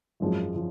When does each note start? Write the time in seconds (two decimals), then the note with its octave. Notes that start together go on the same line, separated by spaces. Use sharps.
0.20 G#1 F#2 F3 G#3
0.56 F3